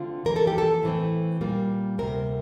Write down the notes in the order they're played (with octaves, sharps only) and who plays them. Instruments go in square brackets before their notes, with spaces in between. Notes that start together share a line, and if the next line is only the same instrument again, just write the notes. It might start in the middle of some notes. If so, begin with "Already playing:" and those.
Already playing: [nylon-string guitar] D3 A3 C4 F4
F2 E3 A#3 A#4
A4
G4
A4
A2 E3 A3 C4
A#2 G3 A#3
D2 C3 G3 C4 A#4